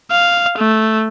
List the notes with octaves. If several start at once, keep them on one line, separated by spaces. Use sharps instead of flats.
F5
A3